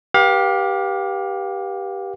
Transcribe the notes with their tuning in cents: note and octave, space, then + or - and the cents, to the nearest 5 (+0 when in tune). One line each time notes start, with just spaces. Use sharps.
G4 +0 B4 -35 F5 +30